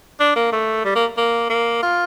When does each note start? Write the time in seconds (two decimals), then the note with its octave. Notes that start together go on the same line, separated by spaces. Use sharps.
0.20 D4
0.36 A#3
0.53 A3
0.85 G3
0.95 A#3
1.17 A#3
1.50 A#3
1.83 F4